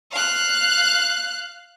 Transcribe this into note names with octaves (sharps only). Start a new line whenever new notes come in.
F5 F#6